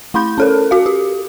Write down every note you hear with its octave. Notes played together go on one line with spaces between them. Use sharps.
A3 E4 B5 G6
C#4 A4 A#4
F#4 F5
G4